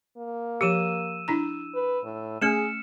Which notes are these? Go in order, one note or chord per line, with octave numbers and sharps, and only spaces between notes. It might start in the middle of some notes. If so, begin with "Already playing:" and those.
A#3
F3 G4 E6 D#7 E7
D4 E4 A#5
B4
A2
A3 C#4 G#4 F6 C#7 E7